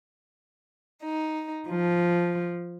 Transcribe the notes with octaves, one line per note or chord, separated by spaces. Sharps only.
D#4
F3